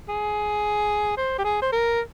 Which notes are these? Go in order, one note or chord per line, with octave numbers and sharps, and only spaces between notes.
G#4
C5
G4
G#4
C5
A#4